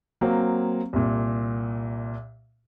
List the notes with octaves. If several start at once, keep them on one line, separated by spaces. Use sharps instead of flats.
F#3 A#3 C4
C2 A#2